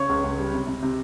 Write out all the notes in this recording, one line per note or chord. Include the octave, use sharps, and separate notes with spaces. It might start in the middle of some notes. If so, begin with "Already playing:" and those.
Already playing: C#3 C#5
C#2
C#2
G3
C3
C3
C3